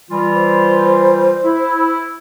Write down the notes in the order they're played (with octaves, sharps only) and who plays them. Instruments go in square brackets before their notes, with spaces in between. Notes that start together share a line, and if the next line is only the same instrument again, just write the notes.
[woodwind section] E3 G3 F4
[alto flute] C5
[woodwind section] E4